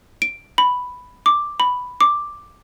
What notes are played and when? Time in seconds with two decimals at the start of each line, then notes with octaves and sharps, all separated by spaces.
0.22 D7
0.58 B5
1.26 D6
1.60 B5
2.01 D6